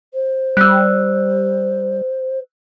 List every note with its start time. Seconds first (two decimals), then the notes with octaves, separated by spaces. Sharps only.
0.14 C5
0.57 G3 E6 F#6